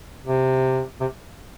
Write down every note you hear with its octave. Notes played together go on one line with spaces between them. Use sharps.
C3
C3